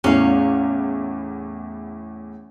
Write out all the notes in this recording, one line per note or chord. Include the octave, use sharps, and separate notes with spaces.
E2 A2 C#4 F5